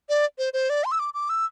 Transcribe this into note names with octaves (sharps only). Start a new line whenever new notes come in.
D5
C5
C5
D5
C6
E6
D6
D6
E6